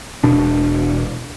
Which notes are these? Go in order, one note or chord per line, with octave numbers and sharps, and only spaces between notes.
E1 B2 D4